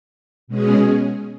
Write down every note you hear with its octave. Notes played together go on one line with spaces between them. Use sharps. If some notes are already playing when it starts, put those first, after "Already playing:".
B2 G#3 C#4 G#4